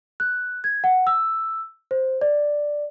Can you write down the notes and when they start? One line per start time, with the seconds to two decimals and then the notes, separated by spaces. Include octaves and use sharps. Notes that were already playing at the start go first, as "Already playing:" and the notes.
0.20 F#6
0.64 G#6
0.84 F#5
1.07 E6
1.91 C5
2.21 D5